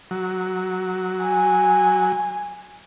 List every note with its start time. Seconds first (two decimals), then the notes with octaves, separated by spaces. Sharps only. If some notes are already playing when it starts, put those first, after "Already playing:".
0.11 F#3
1.23 G#5